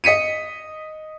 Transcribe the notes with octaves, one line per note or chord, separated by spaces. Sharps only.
D#5 B6 C#7 D#7